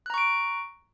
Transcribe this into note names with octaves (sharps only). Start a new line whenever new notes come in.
A#5 C#6 F#6 D7